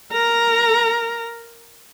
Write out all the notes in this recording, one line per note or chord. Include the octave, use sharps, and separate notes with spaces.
A#4 A#5